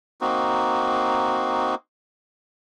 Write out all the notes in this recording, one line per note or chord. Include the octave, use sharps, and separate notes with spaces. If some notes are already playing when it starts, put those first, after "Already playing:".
A#3 C4 D#4 F#4